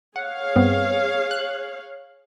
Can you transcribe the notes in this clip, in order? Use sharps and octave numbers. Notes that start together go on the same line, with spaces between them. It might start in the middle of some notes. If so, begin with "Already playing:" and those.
G#4 C#5 F5 F#5
G2 B3 C4
F#6